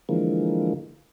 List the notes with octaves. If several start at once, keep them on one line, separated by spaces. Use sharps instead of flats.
D3 E3 F3 G#3 A#3